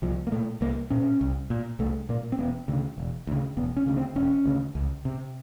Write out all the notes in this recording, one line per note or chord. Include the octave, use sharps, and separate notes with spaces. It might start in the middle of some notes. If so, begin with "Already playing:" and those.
C2 F3
A#3
A#2 A3
C2 A#3
A#2 C#4
C2
A#2
C2 A3
A#2 A#3
C4
E1 B3
D2 C#3
E1
D2 C#3
E1 B3
C#4
D2 C#3
C4
E1 C#4
D2 C#3
C#2
C3